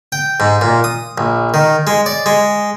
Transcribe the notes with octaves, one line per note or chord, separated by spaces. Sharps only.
G5
G#2
A#2
D#6
A#1
D#3
G#3
D5
G#3